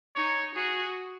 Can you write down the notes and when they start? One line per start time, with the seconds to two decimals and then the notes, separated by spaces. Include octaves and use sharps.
0.16 D#4 C#5
0.56 F#4 G#4